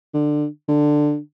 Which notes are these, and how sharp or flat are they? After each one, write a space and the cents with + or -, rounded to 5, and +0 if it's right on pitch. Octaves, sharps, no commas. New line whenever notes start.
D3 +20
D3 +10